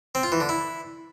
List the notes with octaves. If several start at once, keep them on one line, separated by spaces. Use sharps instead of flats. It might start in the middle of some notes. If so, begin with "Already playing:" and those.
C4
F4
E3
D3
E4